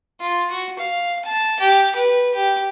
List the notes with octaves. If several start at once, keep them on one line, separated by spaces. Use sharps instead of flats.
F4
F#4
F5
A5
G4
B4
G4